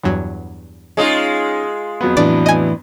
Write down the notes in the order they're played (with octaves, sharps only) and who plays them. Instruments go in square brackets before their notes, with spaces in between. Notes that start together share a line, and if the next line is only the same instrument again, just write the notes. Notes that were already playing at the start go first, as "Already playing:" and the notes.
[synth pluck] E2 G2 F#3
[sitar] G#3 F4 [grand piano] C#4 D#4
[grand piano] F2 F#3 B3
[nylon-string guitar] A2 E3 D4 [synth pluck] D5
[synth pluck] D#5 G#5